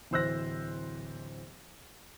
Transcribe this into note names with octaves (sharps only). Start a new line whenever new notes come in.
D1 E3 C5 E6 F#6 A#6